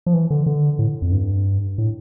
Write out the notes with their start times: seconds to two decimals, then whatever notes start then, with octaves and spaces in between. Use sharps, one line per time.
0.06 F3
0.14 E3
0.30 D3
0.46 D3
0.79 A2
1.02 F2
1.12 G2
1.78 A2